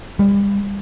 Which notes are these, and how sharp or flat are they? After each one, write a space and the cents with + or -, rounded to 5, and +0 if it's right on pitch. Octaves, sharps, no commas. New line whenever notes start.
G3 +35